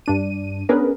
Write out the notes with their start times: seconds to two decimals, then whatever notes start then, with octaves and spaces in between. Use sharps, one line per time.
0.06 G2 D4 D#7
0.69 B3 C#4 D4 G#4 A#4 B4